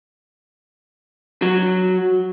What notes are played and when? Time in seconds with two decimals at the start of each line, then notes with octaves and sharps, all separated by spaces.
1.42 F#3